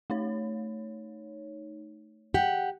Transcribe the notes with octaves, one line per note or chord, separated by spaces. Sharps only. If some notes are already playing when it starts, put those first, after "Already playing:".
A3 D#4 C#5
G4 F#5